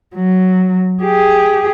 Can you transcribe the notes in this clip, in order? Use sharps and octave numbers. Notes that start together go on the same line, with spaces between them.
F#3
G4 G#4